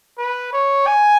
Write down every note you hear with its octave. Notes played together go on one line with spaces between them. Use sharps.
B4
C#5
G#5